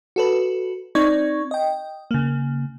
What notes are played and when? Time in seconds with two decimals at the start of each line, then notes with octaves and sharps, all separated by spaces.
0.16 F#4 A4 B4
0.95 C4 D#4 D5 C#6 G#6
1.51 D#5 G5
2.11 C#3 A#3